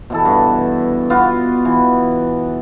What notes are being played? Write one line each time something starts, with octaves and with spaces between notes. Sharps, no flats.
B2 E3 A4
G2
B3 F4 F#4
E3